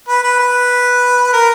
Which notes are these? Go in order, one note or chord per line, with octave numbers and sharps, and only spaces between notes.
B4
B4
B4
A#4